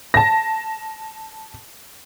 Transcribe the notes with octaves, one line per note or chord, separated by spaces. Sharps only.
A5 A#6